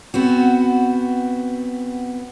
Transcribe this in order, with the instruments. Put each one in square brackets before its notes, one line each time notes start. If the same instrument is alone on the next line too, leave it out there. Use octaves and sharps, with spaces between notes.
[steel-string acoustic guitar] B3 C4 F#4